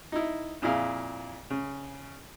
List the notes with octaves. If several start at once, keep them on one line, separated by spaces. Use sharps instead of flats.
D#4 E4
F2 A#2 E4 G#4 F5
C#3